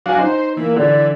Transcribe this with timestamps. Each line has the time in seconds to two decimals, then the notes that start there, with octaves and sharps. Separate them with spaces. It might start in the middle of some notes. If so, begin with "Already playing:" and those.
0.06 F#3 D4 F#4 F5 G#5
0.19 D#4 C5
0.57 E3 A#3
0.76 D3 D5